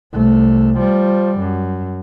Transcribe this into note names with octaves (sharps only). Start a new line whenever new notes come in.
C2 A3
F3 G3
F#2